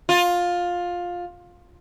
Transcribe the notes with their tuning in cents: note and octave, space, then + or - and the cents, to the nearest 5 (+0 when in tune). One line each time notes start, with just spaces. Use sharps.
F4 +15